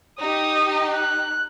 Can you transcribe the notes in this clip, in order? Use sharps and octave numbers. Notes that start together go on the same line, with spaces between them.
D#4 G4 D#6
F#6